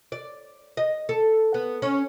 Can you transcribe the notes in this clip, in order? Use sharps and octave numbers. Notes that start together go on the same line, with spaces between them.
D5
D#5
A4
B3
C#4